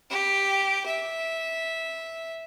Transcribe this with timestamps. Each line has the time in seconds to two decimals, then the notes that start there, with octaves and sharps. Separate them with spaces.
0.10 G4
0.86 E5